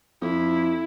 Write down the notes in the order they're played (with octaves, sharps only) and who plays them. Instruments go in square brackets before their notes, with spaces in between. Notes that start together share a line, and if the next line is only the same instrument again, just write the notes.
[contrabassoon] F2 [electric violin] E4